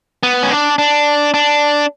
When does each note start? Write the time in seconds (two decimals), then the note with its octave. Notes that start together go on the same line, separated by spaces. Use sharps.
0.23 B3
0.43 C#4
0.51 D4
0.78 D4
1.34 D4